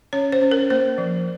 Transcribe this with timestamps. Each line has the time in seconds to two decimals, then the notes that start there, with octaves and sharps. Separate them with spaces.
0.13 C#4 C#5
0.32 C5
0.42 C#4
0.51 A#4
0.70 A#3 C5
0.98 F3